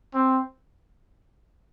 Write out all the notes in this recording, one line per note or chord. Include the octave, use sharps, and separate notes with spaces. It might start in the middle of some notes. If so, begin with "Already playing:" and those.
C4